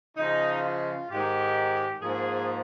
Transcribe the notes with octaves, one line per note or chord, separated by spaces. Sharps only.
C#3 F3 G#3 D#4
F4
G#2 D#3 G#3 G4
G#2 F3 A#3 G#4